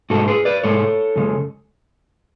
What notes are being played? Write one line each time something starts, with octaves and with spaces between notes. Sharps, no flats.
G#2 G#3 F#4 A4
G#4 B4
B4 D5
G#2 G#3 A4 C#5
F#2 C#3 G#3